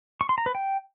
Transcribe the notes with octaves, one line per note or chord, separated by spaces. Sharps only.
C#6
C6
A#5
B4
G5